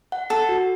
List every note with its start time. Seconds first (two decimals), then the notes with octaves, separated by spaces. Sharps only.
0.12 F#5
0.30 A4 F#5
0.49 F#4